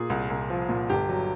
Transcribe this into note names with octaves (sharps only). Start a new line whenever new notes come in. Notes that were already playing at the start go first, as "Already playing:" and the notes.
Already playing: A#2 G#4
C2
C2
F3
A#2
G1 G4
F#3